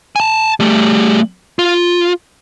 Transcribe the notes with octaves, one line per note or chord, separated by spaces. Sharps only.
G#5 A5
G3 A3
F4